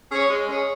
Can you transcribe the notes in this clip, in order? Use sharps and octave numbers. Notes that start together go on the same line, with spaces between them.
C#4 G#4 C#5
G#3
C#4 G#4 C#5